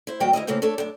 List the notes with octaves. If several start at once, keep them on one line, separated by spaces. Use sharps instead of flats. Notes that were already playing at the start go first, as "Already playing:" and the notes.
E4 C5
D#2 F3 G3 F#4 G5
D2 E4 A#4 D#5
C#3 A3 A#3 C4 E4 F4
A3 D4 A4 C#5
F#2 D4